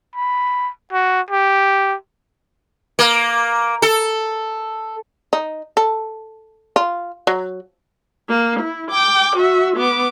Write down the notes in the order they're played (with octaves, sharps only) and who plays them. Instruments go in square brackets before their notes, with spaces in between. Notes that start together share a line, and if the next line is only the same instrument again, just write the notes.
[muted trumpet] B5
F#4
G4
[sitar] A#3
A4
[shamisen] D#4
A4
F4
F#3
[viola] A#3
E4
G5 D6
F#4 E5
B3 D6